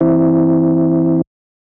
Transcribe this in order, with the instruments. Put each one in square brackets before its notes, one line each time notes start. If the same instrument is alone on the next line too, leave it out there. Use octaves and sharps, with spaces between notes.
[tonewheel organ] E3 C4 E4